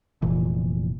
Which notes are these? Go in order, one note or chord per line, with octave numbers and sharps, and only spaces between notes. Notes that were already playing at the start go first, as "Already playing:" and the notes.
F1 A#2 E3